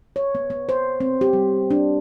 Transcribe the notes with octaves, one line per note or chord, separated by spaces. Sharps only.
C#5
B3
B3
C5
C4
G4
G3
D4